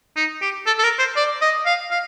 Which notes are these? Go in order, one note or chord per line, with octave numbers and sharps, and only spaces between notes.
D#4
G4
A4
A4
A#4
C5
D5
D#5
F5
F5